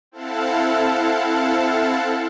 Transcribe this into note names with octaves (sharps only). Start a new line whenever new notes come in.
C4 E4 A4 F5 F#5 A5